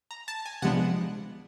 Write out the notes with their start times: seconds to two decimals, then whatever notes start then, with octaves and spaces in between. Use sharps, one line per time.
0.11 A#5
0.28 A5
0.46 G#5
0.62 C3 F3 G#3 B3 D4 F#5